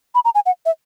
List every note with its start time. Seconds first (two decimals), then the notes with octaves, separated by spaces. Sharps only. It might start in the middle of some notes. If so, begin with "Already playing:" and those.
0.15 B5
0.25 A#5
0.35 G#5
0.46 F#5
0.66 E5